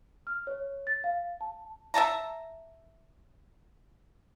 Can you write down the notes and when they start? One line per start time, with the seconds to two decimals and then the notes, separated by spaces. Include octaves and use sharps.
0.27 F6
0.47 C#5
0.87 A6
1.04 F5
1.41 A5
1.94 E5 G5 A5 A#5